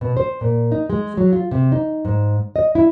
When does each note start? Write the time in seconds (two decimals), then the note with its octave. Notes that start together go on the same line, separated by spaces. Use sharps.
0.01 B2
0.17 C5
0.41 A#2
0.72 D#4
0.90 G#3
1.17 F#3
1.33 F4
1.51 C3
1.72 D#4
2.05 G#2
2.56 D#5
2.75 E4